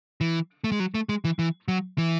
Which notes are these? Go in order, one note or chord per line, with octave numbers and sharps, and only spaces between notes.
E3
A3
G#3
F#3
A3
G#3
E3
E3
F#3
E3